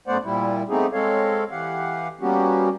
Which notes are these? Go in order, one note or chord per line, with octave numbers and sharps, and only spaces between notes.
F#2 A3 B3 C5 D5 F#5
A#2 G3 E4
A3 B3 C4 D#4 G4 G#4
G#3 C4 A4 C#5 F5
E3 G4 F5 F#5
G3 A#3 B3 C#4 F#4 G4